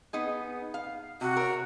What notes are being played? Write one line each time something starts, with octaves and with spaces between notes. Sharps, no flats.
B3 D#4 G#4
F5
C3 F#4
A#4 C#5